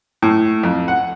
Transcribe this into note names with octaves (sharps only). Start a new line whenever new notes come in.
A2
F2
F#5